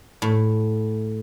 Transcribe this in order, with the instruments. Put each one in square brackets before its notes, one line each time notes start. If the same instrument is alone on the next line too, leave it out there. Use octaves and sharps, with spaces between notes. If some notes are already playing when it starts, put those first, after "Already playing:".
[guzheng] A2